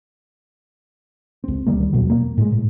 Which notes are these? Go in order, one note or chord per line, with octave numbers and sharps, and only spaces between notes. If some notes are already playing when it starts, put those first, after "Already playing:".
C#2 C4
D2 D#3 G3 A#3
E1 F2 B2 F#3
A#3
A2 G#3
A2